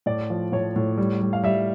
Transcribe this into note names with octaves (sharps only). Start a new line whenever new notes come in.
A2 D5
F3
A2 C#5
A2
G3
G3
F5
G3 E5